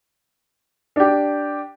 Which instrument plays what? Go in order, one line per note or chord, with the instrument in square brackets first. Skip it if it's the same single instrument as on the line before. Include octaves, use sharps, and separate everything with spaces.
[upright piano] D4 G4